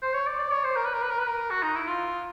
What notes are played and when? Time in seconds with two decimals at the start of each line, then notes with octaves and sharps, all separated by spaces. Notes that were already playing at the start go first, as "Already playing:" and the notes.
0.02 C5
0.14 C#5
0.27 D5
0.39 D5
0.51 C#5
0.64 C5
0.76 A#4
0.85 B4
0.93 A#4
1.02 B4
1.10 A#4
1.19 B4
1.27 A#4
1.50 F#4
1.63 D#4
1.75 E4
1.87 F4